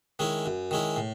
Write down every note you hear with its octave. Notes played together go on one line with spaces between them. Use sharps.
D#3 G#3 C#4 E4
F#2
D#3 G#3 C#4 E4
A2